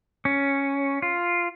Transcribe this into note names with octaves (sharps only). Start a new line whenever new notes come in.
C#4
F4